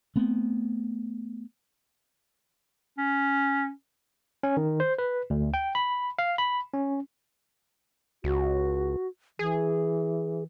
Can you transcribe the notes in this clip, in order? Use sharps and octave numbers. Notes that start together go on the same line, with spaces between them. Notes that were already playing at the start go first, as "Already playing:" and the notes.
A3 B3 C4
C#4
C#4
D#3
C5
B4
D2
G5
B5
F5
B5
C#4
C#2 F#4
E3 G#4